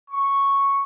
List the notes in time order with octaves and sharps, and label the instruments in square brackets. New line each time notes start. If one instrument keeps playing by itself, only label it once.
[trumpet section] C#6